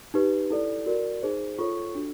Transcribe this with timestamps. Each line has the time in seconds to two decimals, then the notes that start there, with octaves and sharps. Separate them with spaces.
0.14 D#4 G4 B4
0.50 E4 A4 D5
0.86 F#4 A#4 D5
1.23 D#4 G#4 C5
1.59 F4 A4 C#5 C#6
1.95 D4 F#4 A4